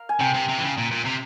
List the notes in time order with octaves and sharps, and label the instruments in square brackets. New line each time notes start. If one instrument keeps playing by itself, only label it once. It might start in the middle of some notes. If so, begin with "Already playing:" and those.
Already playing: [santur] A#4 F5
G#5
[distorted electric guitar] C3 [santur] G5
[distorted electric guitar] C3
C3
E3
C#3
A#2
A#2
C3